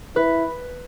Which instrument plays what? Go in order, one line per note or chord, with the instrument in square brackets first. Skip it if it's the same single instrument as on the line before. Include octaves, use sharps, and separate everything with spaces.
[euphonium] E4 [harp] B4